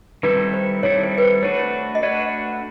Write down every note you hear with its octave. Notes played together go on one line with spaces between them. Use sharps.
D#3 G3 C4 E4 A4 B4
C5
D#3 G3 C4 E4 A4 C#5
C5
B4
C5
A3 D4 F#4 B4 C#5
D#5
A3 D4 F#4 B4 D5